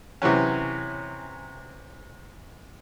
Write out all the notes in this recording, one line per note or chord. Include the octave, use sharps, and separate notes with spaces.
C3 E3 F#3 C#4